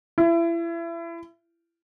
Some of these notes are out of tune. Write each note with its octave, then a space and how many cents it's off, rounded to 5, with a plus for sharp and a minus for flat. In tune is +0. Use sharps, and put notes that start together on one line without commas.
E4 +30